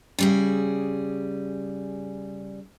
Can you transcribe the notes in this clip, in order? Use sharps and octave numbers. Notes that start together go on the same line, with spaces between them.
C#3 G3 G#4